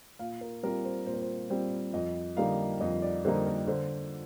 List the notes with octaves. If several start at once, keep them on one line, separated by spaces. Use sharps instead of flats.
A#2 F5
A#4
G3 C4 F4 A#4
C5
A#2 C5
A#4
C5
G3 C4 F4 C5
F2 D#5
D3 G3 A#3 D#4 F5
F2 D#5
D5
D3 G3 A#3 D#4 C5
A#4
D3 C5